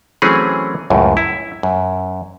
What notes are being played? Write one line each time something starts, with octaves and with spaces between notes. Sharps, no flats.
E3 F#3 A3 C4 C#4 G#4
C#2 F#2 A2
E4
F#2